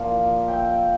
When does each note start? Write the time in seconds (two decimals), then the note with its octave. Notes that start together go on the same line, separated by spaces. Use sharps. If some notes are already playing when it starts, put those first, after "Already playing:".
Already playing: A#2 F3 D5 F5
0.48 E5 G5